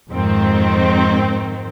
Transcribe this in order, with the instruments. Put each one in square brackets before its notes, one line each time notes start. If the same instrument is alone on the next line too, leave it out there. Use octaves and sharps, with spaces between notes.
[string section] F2 G#2 D#3 C4